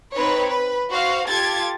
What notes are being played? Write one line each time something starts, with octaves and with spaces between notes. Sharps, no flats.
C4 D#4 B4 C#5
B4
F#4 C5 F5
F4 G4 A4 G#6 A6